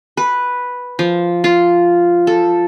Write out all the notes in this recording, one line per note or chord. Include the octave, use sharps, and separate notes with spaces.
B4
F3
F4
A4